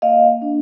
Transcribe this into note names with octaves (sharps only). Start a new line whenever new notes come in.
A#3 D#5 F5
D4